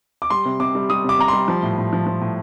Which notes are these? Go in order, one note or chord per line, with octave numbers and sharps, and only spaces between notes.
D6
G3 C6
C3
C3 D6
G3
G3 D#6
C3 D6
C3 A#5
G3 C6
F3
A2
A2
F3
F3
A2